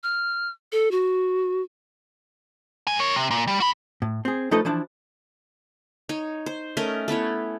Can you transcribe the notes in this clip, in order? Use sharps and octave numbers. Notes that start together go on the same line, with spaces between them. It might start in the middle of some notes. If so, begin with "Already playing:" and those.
F6
A4
F#4
G#2 G#5
A#4 C#5
C3
A#2
G3
F#4 B5
A2
C4 G#4
F3 A3 D#4 A4 B4 D#5
E3 F3 D4 E4
D#4 C#5
C5
A3 C#4 A#4 D#5
A3 B3 E4 C#5